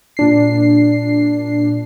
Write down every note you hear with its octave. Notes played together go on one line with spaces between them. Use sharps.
A#2 D4 C7